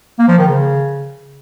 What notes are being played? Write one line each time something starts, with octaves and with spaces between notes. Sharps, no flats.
A#3
F3
D#3
C#3